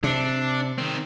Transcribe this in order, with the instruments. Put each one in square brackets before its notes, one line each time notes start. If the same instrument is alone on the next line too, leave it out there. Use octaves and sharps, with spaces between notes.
[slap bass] C3 [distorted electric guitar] D4
[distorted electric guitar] D#3 C4